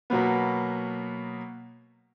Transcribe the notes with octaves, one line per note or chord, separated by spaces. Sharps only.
B2 F#3 A#3 B3